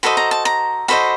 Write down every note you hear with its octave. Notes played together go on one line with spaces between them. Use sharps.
F#4 A4 C5 D#5 B5
A#5
A5
A#5
F#4 A4 C5 D#5 B5